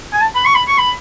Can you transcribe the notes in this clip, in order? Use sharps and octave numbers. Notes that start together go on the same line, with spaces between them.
G#5
A5
B5
C#6
B5
C#6
B5